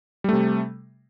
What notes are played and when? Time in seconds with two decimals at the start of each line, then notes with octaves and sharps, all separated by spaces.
0.24 G3
0.29 A3
0.33 C3